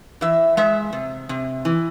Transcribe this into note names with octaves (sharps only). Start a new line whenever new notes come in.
E3 E5
G#3 E5
C3
C3
E3